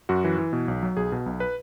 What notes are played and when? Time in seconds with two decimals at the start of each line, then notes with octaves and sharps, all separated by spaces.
0.09 F#2 F#4
0.24 E3
0.38 E3
0.53 B2
0.68 B1
0.83 F#3
0.97 B1 G#4
1.12 B2
1.26 B1
1.40 B4